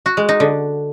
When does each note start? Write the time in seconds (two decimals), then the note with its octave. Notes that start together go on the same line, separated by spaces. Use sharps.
0.06 F#4
0.17 G#3
0.29 D#4
0.40 D3